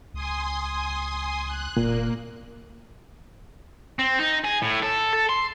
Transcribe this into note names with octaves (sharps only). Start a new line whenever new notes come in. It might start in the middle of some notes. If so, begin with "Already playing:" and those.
C#2 G#5 C6 D#6
F#6
F1 A#2 A#3
C4
D#4
G#4
A2
A4
A4
C6